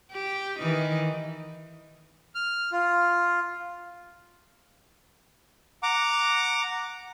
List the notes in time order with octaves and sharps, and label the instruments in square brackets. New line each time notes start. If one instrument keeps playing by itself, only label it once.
[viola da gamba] G4
D#3 E3 D#4
[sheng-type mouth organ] F6
F4
F#5 A#5 D6